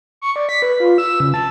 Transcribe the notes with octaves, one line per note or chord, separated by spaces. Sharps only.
C#6
D5
B6
B4
F4
E6
C#3
A5